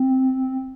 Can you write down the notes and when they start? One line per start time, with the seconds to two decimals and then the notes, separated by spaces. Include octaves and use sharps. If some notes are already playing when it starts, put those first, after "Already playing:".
Already playing: C4